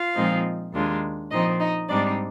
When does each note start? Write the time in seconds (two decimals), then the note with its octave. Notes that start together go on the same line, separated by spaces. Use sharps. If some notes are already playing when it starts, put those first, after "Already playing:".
Already playing: F4 F5
0.15 A#2 F3 G#3 C4 D#4
0.74 D#2 D#3 G#3 D4 F4
1.31 A#2 F3 C4 D#4 D#5
1.60 D#4 D#5
1.89 G#2 G3 C4 D4 D#4 D5